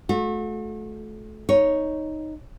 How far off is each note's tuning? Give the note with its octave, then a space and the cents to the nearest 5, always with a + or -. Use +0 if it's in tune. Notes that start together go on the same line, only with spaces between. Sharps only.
A3 -30 F#4 -40
D#4 +0 C#5 +0